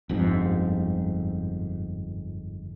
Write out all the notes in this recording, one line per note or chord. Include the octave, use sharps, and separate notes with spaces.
G1 F2 G#2